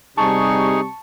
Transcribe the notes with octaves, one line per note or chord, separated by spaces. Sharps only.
C3 G3 D#4 G#4 A5 C#6